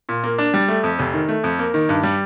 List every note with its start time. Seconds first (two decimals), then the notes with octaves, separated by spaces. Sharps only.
0.09 A#2
0.24 A#3
0.38 D4
0.54 G3
0.68 A3
0.84 F2
0.99 F1
1.14 D#3
1.29 A3
1.44 F2
1.59 A#3
1.74 D#3
1.89 G2
2.03 G3